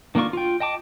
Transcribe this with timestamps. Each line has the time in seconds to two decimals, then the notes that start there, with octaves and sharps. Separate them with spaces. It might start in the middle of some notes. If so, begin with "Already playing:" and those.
0.15 D#3 A#3 D4 F4 C#6
0.33 F4 G5
0.60 D#5 G5 A5 D6